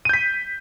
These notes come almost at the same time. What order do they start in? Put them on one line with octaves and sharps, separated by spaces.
D#7 G6 B6